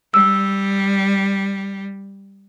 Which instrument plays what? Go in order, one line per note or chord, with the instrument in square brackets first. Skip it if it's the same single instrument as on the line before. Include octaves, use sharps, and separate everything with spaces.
[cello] G3 [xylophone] E6